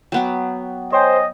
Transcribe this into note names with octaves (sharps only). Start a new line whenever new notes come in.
F#3 B3 F#5 G5 D6
C5 C#5 D#5 G5 G#5